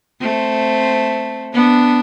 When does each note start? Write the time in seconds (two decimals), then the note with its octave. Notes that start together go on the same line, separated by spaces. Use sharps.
0.21 A3 C4
1.54 B3 D4